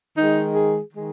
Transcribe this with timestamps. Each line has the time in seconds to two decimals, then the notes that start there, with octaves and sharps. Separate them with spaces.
0.17 D#3 G#3 D#4
0.55 G#4
0.93 D#3 G#3